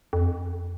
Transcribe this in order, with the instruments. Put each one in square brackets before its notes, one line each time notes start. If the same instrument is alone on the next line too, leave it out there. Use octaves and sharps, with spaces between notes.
[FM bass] F2